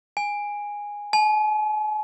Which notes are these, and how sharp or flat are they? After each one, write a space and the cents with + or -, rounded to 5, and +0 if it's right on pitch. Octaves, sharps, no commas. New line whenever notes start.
G#5 -10
G#5 +45